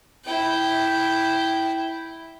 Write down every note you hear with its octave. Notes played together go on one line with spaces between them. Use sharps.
E4 G5